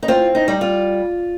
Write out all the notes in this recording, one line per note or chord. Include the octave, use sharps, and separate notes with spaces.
D#4
C4 F4
D#4
G3
F4